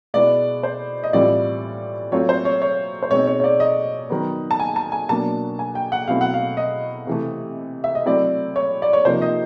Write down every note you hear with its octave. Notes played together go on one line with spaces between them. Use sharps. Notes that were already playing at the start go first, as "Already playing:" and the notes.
B2 G#3 B3 E4 D5
C5
D#5
A2 E3 G3 C4 F4 D5
F#3 A3 C4 F4 C#5
C5
C#5
C#5
C5
B2 G#3 C4 D#4 C#5
C#5
C#5
D5
D#5
D#3 F#3 B3
A5
G#5
A5
G#5
B2 F#3 A#3 D4 A5
G#5
G5
F#5
B2 F#3 A3 C4 E4 F5
F#5
F5
D#5
C3 E3 A3
E5
D#5
F#3 A3 C4 E4 D5
C#5
D5
C#5
C3 F3 A#3 D#4 C5
D#5